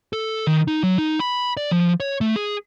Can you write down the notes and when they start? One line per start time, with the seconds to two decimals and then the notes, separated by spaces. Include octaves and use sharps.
0.13 A4
0.47 D#3
0.68 D#4
0.83 F#3
0.98 D#4
1.20 B5
1.57 D5
1.71 F3
2.00 C#5
2.21 A3
2.36 G#4